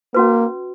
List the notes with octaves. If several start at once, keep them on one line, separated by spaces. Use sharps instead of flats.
A#3 C#4 F#4 B4